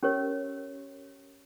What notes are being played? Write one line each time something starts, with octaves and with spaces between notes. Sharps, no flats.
C#4 G4 A#4 C#5